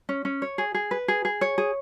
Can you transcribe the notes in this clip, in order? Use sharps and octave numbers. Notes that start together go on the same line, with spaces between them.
C#4
C#4
C#5
G#4
G#4
B4
G#4
G#4
C#5
G#4